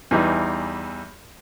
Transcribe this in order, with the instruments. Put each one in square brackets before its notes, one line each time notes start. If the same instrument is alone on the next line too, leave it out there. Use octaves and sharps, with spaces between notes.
[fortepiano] E2 E3 G3 D#4